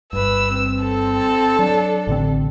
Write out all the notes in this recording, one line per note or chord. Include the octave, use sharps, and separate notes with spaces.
G1 G2 B4 E6
C4
A4
F#3 D4
A1 D3 C4